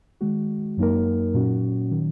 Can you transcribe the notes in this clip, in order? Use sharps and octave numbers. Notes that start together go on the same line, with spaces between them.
D#3 G#3 F#4
F#2 F#3 A#3 D#4 A#4
A#2 F#3 C#4 F#4
D#3 F#3